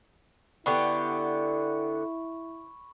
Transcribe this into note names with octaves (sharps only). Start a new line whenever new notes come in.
D3 B3 E4 G4 B5 C#6